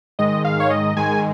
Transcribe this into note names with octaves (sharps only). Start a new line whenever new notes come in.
G#2 D#3 G#3 D#5
F5
C#5
D#5
G#2 D#3 G#3 G#5